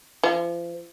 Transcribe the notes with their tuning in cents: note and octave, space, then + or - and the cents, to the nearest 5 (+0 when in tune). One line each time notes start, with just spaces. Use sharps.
F3 -35